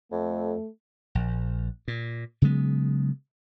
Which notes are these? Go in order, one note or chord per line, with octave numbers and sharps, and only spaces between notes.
F2 A3
A#1
A#2
C#3 F#3 G#3 B3